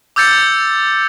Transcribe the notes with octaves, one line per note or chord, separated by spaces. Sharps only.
D6 E6 G6 A6 C#7